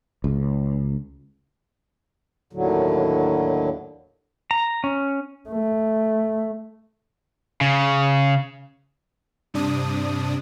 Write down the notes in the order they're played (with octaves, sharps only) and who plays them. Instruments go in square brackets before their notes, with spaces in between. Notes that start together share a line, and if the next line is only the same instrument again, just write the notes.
[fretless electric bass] C#2
[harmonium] D#2 A2 D3 F#3
[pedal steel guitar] A#5
C#4
[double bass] A3
[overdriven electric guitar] C#3
[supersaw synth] G2 C3 D4 D#6